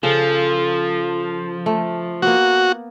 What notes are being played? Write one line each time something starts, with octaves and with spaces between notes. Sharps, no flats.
C#3 F3 A4
A3
A#3 B3 F#4